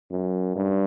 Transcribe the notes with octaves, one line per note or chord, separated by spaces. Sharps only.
F#2
G2